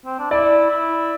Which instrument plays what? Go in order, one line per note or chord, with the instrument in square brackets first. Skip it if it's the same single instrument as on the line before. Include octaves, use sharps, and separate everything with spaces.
[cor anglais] C4
D4
[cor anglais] E4 [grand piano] D5
[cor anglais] E4